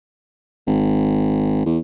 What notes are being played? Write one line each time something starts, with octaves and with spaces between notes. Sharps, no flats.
G#1
E2